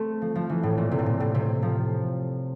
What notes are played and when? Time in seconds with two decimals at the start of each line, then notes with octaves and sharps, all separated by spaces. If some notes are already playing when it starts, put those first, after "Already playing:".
Already playing: A3 C4
0.22 F3
0.35 F3
0.50 E3
0.63 A2
0.78 A#2
0.91 C3
0.99 A2
1.06 A#2
1.20 A2
1.35 C3
1.62 F3